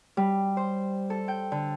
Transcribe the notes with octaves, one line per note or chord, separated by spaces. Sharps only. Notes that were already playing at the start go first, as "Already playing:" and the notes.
G3
C5
A4
G5
D3